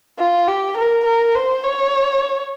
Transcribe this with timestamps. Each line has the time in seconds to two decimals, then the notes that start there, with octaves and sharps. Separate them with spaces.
0.18 F4
0.48 G4
0.77 A#4
1.05 A#4
1.35 C5
1.63 C#5